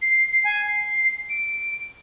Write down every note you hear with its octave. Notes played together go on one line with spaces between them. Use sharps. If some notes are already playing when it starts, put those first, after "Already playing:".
C7
G#5
C7
D7